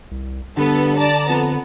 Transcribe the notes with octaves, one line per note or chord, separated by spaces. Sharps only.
C2
G2 D3 B3 A4
D5 A5 A#5
F2 B3